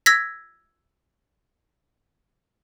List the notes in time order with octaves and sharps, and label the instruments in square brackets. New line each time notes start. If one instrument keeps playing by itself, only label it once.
[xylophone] E6 G#6 A#6 B6